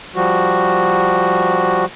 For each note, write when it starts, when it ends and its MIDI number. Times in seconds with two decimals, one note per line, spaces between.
0.15 1.85 53
0.15 1.85 55
0.15 1.85 66